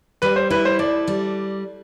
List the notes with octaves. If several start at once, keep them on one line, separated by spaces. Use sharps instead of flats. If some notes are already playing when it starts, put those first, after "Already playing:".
G3 B4
C5
E4 B4
C5
A4 D5
G3